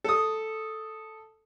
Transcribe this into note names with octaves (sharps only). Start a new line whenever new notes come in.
A4 D#6